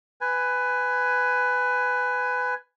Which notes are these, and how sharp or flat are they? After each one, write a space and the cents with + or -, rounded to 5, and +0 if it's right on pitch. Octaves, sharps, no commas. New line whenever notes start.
B4 +15 G#5 +0